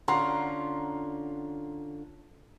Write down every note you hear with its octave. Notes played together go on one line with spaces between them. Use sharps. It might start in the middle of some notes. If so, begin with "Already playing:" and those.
D3 C#4 F4 F#5 A#5 C6